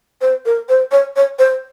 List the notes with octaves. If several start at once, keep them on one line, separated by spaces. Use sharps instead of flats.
C5
A#4
C5
C#5
C#5
C5